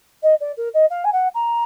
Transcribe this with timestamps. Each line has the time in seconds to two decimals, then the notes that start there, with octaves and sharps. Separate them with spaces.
0.23 D#5
0.40 D5
0.57 A#4
0.74 D#5
0.90 F5
1.04 G#5
1.12 F#5
1.34 A#5